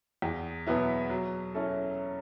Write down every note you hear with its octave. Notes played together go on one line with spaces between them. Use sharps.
E2
B2 F#3 B3 E4
F#3
C#4 E4 A4